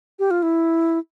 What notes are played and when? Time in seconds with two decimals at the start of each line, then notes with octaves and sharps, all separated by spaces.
0.19 G4
0.31 F4
0.43 E4